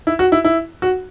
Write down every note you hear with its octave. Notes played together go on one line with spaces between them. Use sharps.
E4
F#4
E4
E4
F#4